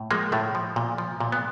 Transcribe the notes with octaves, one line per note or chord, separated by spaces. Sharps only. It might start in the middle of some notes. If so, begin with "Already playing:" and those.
Already playing: A2
F3 G#3 A#3
A2 A3
F3
A#2
F3
A#2
B3